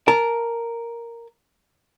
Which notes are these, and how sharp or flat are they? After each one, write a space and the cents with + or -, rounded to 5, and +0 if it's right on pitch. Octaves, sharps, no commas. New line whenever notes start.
A#4 +0 A5 -15